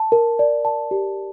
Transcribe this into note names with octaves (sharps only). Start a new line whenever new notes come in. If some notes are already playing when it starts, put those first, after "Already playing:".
Already playing: A5
A#4
D5
A5
G4